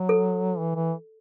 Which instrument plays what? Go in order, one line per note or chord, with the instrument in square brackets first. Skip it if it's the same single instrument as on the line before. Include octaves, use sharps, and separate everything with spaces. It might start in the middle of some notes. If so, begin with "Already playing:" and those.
Already playing: [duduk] F#3
[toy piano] A4
[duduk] E3
E3